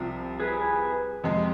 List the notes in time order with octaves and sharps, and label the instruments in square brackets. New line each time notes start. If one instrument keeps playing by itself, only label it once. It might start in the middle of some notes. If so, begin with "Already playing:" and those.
Already playing: [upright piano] C2 C3 F3
[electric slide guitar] G#4 B4
[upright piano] F2 C3 G#3